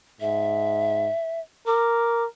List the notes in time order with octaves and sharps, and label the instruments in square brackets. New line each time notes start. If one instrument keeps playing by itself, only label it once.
[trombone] G#2 [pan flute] E5
[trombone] A#4 [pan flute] D6